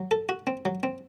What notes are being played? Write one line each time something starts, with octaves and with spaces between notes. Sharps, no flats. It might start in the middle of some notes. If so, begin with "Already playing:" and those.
Already playing: F#3
A4
F#4
C4
F#3
C4